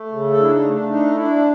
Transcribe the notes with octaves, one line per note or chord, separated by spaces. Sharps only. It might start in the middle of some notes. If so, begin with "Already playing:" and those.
Already playing: A3
C#3
A4
D4 E4
D#4
A3
D4
D4 D#4
D4 E4